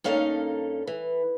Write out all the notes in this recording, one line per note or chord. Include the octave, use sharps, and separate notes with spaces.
G2 A#3 C#4 D#4 A4 F5
E3